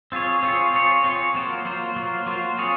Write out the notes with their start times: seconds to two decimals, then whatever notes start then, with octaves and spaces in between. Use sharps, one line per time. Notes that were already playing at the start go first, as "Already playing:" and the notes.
0.12 C4 F4 G#4 C#5
0.43 C4 F4 G#4 C#5
0.73 C4 F4 G#4 C#5
1.04 C4 F4 G#4 C#5
1.34 F#3 A#3 F4 C5
1.65 F#3 A#3 F4 C5
1.96 F#3 A#3 F4 C5
2.26 F#3 A#3 F4 C5
2.58 C4 F4 G#4 C#5